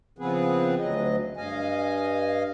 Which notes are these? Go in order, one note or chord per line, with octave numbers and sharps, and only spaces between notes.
C#3 F3 B3 C4 G#4 B4
D2 F#3 D#5
G2 D#5 F5 G#5